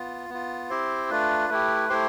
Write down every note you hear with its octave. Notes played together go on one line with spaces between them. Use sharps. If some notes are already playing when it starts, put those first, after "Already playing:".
Already playing: B3 F4
B3 F4
C4 E4 G4 C5
A3 D4 F4 B4
A3 E4 G4
A3 E4 G4 C5